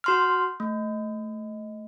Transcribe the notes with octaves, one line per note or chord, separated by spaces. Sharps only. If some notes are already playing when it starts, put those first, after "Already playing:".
F#4 C6 F6
A3